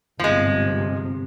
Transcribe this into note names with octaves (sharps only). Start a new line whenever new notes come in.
G1 G#2 C3 F3 G#3